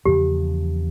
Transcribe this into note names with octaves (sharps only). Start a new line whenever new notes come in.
E2 C#3 F3 A#3 G4